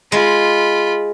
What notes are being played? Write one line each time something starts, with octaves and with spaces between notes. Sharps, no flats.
G#3 F4 B5